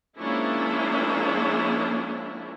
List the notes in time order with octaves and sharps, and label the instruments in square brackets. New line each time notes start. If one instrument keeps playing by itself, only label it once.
[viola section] F3 G#3 A#3 C#4 D4 E4